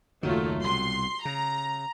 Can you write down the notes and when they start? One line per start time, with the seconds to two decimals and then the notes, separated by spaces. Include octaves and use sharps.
0.23 F#1 D#2 D#3 F#3 A3 F4
0.64 C2 B2 C6
1.25 C#3 A#5